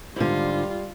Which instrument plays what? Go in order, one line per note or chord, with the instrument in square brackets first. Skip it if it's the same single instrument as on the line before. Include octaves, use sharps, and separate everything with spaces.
[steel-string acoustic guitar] G#2 D3 [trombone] G3 [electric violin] F4